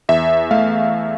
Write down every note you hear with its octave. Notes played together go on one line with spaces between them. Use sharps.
E2 E5
A3 F5